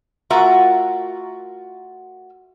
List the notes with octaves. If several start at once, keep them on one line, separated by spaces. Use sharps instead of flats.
A3 F4 F#4 A#4 E5 F#5